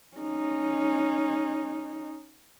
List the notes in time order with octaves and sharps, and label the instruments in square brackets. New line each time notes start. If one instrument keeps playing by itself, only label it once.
[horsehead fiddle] C#4 D#4